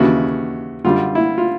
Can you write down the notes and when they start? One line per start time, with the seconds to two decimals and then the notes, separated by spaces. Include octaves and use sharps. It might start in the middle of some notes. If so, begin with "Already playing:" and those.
Already playing: D#2 C#3 E3 F#4
0.85 F#2 D3 G3 F4
1.15 E4
1.38 F4